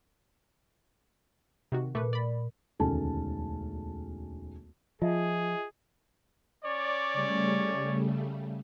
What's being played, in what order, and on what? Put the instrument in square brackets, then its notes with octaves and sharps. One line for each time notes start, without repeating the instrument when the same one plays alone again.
[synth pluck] C3 D#3 F#4
[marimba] A#2 [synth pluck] A3 B4
[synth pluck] D5 B5
[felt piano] E1 D2 D#3 C#4 A4 A5
[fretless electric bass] F3 [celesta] F4 D#5 E5 [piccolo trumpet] G#4
[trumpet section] C#4 C#5 D5
[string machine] C#3 G3 A3